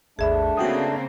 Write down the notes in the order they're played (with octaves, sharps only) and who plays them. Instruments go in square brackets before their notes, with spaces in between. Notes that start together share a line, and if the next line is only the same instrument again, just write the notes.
[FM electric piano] G#1 D#2 [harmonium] A3 D4 [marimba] G#4 E5 B5
[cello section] C#3 A#3 C4 [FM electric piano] F#4 G5 D#6